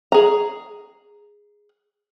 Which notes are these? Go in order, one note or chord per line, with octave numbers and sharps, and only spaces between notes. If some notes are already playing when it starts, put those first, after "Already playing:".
G#4 A#5